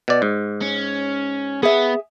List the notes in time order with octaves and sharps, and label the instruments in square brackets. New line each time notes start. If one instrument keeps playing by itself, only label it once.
[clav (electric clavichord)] B2 D5
G#2
[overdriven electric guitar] C#4
[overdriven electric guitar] B3 [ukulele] G#4 E5